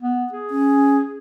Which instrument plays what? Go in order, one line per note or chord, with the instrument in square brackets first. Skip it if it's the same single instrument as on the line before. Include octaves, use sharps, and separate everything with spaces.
[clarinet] B3
G#4
[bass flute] C#4